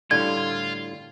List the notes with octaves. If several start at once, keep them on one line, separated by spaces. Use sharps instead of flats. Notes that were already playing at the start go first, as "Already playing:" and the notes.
A2 D3 G3 F4 G#6